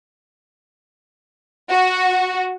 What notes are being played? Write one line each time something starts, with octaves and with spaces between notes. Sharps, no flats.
F#4